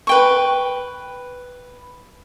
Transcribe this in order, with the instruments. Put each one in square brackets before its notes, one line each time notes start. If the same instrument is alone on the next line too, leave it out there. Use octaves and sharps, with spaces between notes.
[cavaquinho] B4 G5 C#6